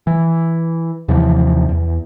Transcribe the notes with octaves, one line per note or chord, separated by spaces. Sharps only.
E3
D#2 C3 E3 F3
E2